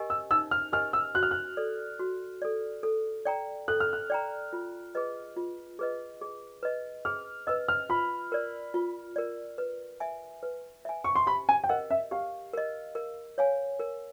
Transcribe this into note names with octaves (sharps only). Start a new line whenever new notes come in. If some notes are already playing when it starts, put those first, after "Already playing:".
Already playing: G4 A#4 D#5 G#5
E6
D#4 E6
F6
G4 A#4 D#5 G#5 F6
E6
F#4 F#6
F6
F#6
A4 D5
F#4
A4 D5
A4
D5 G5 A#5
A4 F#6
F6
F#6
D5 G5 A#5
F4
G#4 B4 D#5
F4
G#4 B4 D#5
G#4
B4 D#5
G#4 F6
B4 D#5 E6
F6
F4 B5
A#4 D5
F4
A#4 D5
B4
E5 G#5
B4
E5 G#5
C#6
C6
G4 B5
G#5
G5
A#4 D#5 F#5
E5
G4 F5
A#4 D#5
A#4
C#5 F5 G#5
A#4